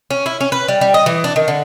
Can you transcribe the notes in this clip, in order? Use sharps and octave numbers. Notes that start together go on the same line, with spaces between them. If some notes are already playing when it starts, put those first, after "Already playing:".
C#4
E4
C#4
B4
G3
G3
D#5
E3
D4
D#3
D3